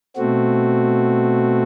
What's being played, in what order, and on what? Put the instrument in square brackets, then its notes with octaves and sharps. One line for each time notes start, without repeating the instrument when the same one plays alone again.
[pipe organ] B2 A3 C4 F#4